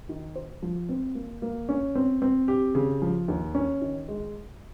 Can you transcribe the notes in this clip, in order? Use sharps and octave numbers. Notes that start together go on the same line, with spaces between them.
D#3
C5
F3
C4
A#3
A#3
C#4
C4
C4
G4
C#3
F3
D#2
C#4
D#3
G#3